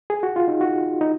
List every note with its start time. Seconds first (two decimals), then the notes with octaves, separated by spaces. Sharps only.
0.10 G#4
0.23 F#4
0.36 F4
0.48 D#4
0.61 F#4
1.01 D#4